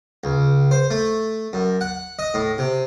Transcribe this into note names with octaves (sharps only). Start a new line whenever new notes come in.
C#2
C5
A3
F#2
F#5
D#5
A2
C3